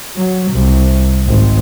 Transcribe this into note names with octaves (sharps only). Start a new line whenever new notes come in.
F#3
C2
G#1